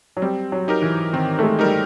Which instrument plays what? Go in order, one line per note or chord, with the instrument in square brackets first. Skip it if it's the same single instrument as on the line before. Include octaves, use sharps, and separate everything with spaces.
[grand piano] F#3
[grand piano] G3 [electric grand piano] C4
[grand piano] F#3
[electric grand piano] D#4 G4 A#4
[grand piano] E3
[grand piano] D#3 [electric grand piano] C4
[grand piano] A3
G#3
[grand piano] G3 [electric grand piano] D#4 G4 A#4